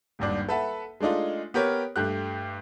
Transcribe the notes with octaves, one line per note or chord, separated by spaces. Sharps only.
D#1 G#1 G2 D4
A4 B4 E5 F#5 A5
G#3 A3 D4 D#4 F4
B3 G4 A#4 C#5
G2 A3 G4 F#6